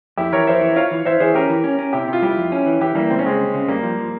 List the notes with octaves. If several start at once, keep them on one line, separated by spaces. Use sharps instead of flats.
F2 E4 G4
E3 A#4 C#5
F2 C5 E5
E3
F4 C#5 F5
E3
E3 C5 E5
E3 G#4 C5
C#4 G4 A#4
E3
C#4
C#4
C3 E4 G4
C3
F4
G3 E4 G4
F2
C#4
E3
E3 E4 G4
E3 G3 A#3
C#2 C4
C#4
C#3 G#3 C4
C#2
C#3
G2 G3 A#3
F3
F3